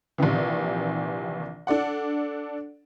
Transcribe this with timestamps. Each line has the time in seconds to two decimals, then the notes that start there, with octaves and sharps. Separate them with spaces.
0.18 A#1 C3 D#3 E3
1.67 D4 A4 D5 F#5